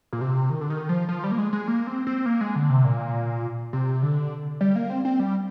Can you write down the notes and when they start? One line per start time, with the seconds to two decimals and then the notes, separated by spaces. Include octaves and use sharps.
0.13 A#2
0.21 C3
0.50 D#3
0.61 D3
0.70 D#3
0.89 F3
1.09 F3
1.24 G3
1.31 A#3
1.38 G#3
1.53 G#3
1.68 A#3
1.87 C4
2.07 C4
2.26 A#3
2.41 G#3
2.56 D3
2.70 C3
2.84 A#2
3.73 C3
4.03 D3
4.61 G3
4.76 A#3
4.90 C4
5.05 C4
5.20 G3